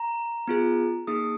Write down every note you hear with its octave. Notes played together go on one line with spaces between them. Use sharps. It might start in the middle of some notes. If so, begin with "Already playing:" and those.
Already playing: A#5
B3 F4 G#4
A#3 D#4 G#4 D#6